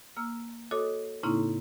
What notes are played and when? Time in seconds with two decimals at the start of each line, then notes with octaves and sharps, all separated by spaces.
0.16 A#3 E6 F6
0.71 F#4 A4 C#5 D#5 D6 D#6
1.23 A2 C#3 A#3 C4 D#4 E4